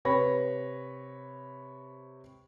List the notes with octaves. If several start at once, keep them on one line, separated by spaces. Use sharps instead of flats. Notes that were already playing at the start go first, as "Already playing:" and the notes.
C3 B4 C#5 B5 A#6